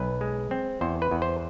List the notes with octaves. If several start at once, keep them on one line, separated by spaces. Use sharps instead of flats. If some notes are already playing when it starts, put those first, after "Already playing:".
Already playing: B1 B4
G#3
C4
E2 C5
B4
E2
C5